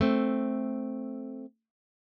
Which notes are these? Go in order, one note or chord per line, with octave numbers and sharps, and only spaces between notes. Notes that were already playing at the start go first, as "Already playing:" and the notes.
A3 C4